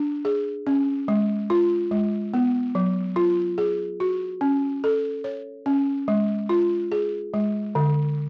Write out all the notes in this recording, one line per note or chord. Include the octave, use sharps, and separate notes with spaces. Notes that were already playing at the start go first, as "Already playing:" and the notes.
Already playing: D4
G#4
C#4
G#3
F4
G#3
B3
F#3
F4
G#4
F#4
C#4
A4
C#5
C#4
G#3
F4
G#4
G#3
D3